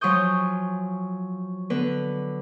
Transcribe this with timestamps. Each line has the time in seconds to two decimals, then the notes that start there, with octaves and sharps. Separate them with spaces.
0.01 F3 F#3 G#5 C#6 D#6 G6
1.70 D3 B3 B4